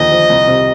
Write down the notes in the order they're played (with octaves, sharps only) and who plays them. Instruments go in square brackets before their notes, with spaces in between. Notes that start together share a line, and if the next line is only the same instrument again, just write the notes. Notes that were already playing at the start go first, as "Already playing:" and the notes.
Already playing: [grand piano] D#2 D3 F3 [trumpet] D#5
[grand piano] F3
C2
C3